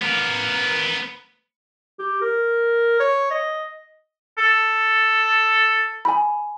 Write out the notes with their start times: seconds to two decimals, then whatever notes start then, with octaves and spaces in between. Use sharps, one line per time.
0.02 B3 A#4
1.99 G4
2.22 A#4
3.00 C#5
3.31 D#5
4.38 A4
6.05 G#5 B5